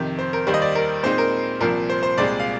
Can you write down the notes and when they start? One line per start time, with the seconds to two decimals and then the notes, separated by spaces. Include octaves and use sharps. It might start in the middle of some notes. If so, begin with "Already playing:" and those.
Already playing: F2 C3 D#3
0.19 C5
0.33 A#4
0.47 D#2 D#3 G3 C5
0.54 D#5
0.62 D5
0.75 A#4
1.03 A#2 G#3 C4 D#4 C5
1.18 A#4
1.60 C2 A#2 F3 C4 A#4
1.90 C5
2.03 C5
2.18 C2 A#2 G#3 C4 D5
2.40 F5